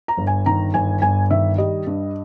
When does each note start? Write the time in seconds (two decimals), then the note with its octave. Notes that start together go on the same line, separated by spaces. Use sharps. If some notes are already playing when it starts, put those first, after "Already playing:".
0.08 A#5
0.17 G1
0.27 G#5
0.46 D#3 A#5
0.74 G1 G#5
1.02 G1 G#5
1.30 D#3 E5
1.58 G3 D#5
1.87 G2